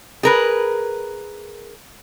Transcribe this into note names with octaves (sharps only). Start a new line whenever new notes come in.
G#4 A#4 B4